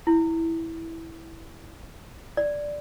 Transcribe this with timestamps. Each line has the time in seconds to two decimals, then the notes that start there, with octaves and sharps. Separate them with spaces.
0.07 E4
2.37 D5